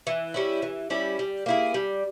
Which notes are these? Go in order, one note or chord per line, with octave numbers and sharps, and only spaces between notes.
E3
G3 C#4 E4
E3
G3 C#4 E4
G3
A#3 E4 G#4
G3